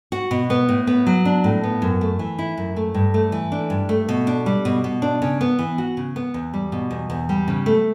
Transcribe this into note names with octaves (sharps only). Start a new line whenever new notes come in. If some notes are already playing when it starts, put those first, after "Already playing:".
F#4
B2
B3
A2
B3
F#3
D4
A2
B3
F#2
A3
E3
E4
F#2
A3
G2
A3
E3
D4
G2
A3
B2
D4
G3
B2
B2
D4
C#3
B3
E3
F#4
C#3
B3
E2
G3
B2
E2
E2
G3
C#3
A3